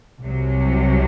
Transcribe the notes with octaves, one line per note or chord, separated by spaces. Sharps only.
C2 C3 F#3